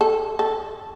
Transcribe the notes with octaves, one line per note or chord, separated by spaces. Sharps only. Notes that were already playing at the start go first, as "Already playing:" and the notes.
A4
A4